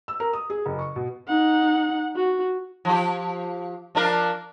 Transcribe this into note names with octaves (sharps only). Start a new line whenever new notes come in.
E6
A#4
D#6
G#4
F#1
C#6
B2
D#4 F#5
F#4
F3 G4
F3 D4 A#4